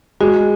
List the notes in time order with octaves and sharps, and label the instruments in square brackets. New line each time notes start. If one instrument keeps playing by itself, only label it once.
[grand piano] G#3 [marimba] F#4